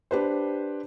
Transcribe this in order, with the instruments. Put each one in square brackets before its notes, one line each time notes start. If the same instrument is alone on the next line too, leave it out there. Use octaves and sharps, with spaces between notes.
[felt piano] D4 G4 B4 C5